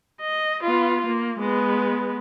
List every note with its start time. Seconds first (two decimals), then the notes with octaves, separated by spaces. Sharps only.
0.21 D#5
0.63 B3 F4
1.07 A#3
1.39 G#3 B3